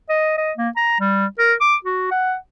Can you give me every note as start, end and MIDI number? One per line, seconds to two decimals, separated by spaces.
0.09 0.35 75
0.38 0.52 75
0.57 0.69 58
0.76 0.96 82
1.00 1.26 55
1.39 1.54 70
1.61 1.75 86
1.85 2.06 66
2.11 2.35 78